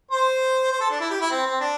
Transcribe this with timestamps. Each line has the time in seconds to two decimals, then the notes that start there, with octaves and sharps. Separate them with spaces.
0.11 C5
0.71 C5
0.80 A4
0.90 D4
1.00 E4
1.10 G4
1.21 E4
1.31 C4
1.46 C4
1.60 D4